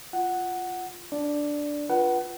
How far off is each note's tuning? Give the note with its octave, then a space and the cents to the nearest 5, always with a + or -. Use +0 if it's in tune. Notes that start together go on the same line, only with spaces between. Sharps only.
F4 +0 F#5 +0
D4 -5 D5 +0
F4 +0 B4 -20 F#5 +25